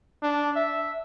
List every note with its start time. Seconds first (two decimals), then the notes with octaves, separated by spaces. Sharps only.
0.23 D4
0.56 E5